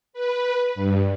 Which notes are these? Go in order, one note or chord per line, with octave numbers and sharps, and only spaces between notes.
B4
G2